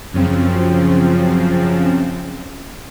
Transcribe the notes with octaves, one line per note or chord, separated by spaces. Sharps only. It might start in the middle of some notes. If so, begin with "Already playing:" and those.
F#2 C#3 F3 C4